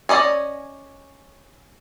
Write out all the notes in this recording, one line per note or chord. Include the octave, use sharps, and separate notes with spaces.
C#4 D5 D#5 G#5